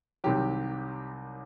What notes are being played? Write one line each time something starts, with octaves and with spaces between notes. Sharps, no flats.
C2 C3 D#3 F#3 G4